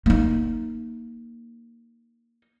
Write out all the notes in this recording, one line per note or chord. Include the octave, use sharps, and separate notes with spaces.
A#3 D#4